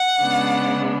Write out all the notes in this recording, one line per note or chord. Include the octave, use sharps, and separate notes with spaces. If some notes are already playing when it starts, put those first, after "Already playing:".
Already playing: F#5
C#3 G#3 B3 D4